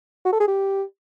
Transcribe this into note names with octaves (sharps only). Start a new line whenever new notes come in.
F#4
A4
G#4
G4